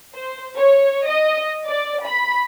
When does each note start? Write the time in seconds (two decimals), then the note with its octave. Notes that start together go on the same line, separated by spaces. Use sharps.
0.15 C5
0.58 C#5
1.07 D#5
1.66 D5
2.05 B5